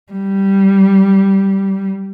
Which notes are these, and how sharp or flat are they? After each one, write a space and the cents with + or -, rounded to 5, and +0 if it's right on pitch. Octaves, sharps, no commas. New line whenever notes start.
G3 -10